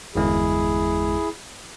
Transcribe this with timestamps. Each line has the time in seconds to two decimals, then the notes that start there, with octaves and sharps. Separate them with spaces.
0.15 G1 E2 G#3 E4 G#4